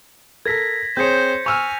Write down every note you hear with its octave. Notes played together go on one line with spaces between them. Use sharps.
A4 A#4 G#6 A#6 B6
C4 G#4 C5 C#5 G6 C#7
G#5 C#6 E6 F6 F7